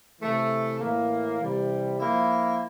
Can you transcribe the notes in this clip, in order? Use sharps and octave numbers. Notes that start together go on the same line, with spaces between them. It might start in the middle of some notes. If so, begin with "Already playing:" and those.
C3 E3 A3
A2 E3 A#3
C3 E3 G3
F3 A#3 E4